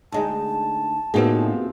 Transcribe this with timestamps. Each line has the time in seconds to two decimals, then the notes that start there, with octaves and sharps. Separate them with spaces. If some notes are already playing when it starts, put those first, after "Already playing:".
0.12 D2 G#3 D#4 A5
1.14 A2 C3 F3 A#3 B3 D#4 F#4 G#4